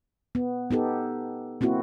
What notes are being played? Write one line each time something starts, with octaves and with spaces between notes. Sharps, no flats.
B3
B3 D#4 G4 A4
A#3 C4 E4 F#4